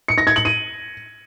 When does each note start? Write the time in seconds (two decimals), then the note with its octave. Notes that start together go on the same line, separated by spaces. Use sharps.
0.08 C#7
0.18 A#6
0.27 G#6
0.36 F#7
0.45 D#7